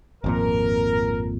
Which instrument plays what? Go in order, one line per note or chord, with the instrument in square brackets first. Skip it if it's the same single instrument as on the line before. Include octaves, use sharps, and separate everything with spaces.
[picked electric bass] G#1 F2 A#2 [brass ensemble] A#4